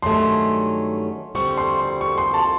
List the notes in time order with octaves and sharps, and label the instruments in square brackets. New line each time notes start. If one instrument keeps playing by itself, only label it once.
[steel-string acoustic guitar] G2 D#3 F#3 A3 C#4 [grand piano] C6
[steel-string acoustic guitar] D3 G3 C4 [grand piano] C#6
[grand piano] C6
C6
C#6
C6
A5